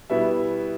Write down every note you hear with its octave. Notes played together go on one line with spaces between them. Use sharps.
B2 G3 B3 E4 E5